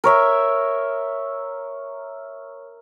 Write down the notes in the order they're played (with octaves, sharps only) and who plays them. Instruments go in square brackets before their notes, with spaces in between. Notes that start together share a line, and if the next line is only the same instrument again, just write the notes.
[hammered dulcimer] A#4 C#5 E5